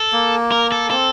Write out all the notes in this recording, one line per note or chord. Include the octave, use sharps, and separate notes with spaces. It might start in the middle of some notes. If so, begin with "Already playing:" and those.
Already playing: A4
A#3
A#4
A4
C4 A4